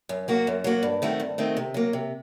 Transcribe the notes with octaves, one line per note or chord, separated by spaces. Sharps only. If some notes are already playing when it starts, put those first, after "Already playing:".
F#2
F#3 A#3 F#4
F#2
F#3 A#3 F#4
G2
D#3 A3 C4 F#4
G2
D#3 A3 C4 F#4
C3
F#3 A#3
C3